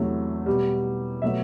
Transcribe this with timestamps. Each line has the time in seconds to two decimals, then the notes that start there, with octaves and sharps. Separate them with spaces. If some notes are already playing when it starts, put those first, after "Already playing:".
Already playing: E2 C3 F#3 A3
0.46 B2 G3
1.22 B2 F#3 A3 E5